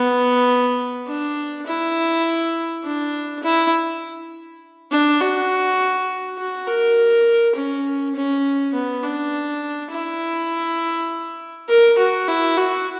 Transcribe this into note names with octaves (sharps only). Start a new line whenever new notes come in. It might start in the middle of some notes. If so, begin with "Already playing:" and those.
Already playing: B3
D4
E4
D4
E4
D4
F#4
F#4
A#4
C#4
C#4
B3
D4
E4
A#4
F#4
E4
F#4